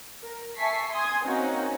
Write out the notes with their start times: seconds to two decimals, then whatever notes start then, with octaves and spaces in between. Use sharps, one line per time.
0.23 A#4
0.57 E5 G#5 A5 C#6 B6 C7
0.91 G#5 C6 D#6 G#6
1.26 A#3 C4 C#4 D#4 F#4